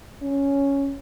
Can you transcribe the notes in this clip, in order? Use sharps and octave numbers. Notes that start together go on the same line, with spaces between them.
C#4